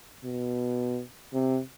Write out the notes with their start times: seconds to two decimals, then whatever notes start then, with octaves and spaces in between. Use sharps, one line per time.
0.24 B2
1.34 C3